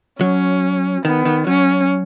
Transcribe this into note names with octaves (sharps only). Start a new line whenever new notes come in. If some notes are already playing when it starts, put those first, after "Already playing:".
F#3 C#4
D#3 B3
D#3
F#3 C#4